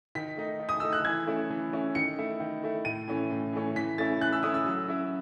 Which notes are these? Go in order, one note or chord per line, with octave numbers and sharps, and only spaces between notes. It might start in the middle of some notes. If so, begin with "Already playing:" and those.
D#3 B6
A3 D#4
D#3
D#6
A3 D#4 E6
F#6
E3 G#6
A3 C#4 E4
E3
A3 C#4 E4
D#3 C#7
A3 E4
D#3
A3 E4
A2 D#7
E3 A3 C#4
A2
E3 A3 C#4
E3 B6
A3 C#4 E4 A6
E3 F#6
E6
A3 C#4 E4 D#6
E6
F#3
C#4 E4